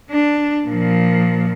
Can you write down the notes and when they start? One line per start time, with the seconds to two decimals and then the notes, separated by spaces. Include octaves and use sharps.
0.11 D4
0.68 A#2 F3